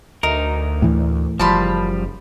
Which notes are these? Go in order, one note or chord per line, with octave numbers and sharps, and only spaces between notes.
D2 D#4 A#4
A2 E3
F#1 F3 G3 A5 B5 C6